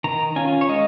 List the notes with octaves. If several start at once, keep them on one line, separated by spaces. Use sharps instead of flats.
D#3 A#5
C#4 F4 G#5
C#5
G#3 D#5